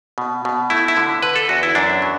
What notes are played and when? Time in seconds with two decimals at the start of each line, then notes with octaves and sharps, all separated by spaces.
0.18 B2
0.45 B2
0.70 A3 E4
0.88 E4
0.97 D3
1.22 D3 B4
1.36 A4
1.49 E2 F#4
1.63 E4
1.75 F#2 D4
2.02 F#3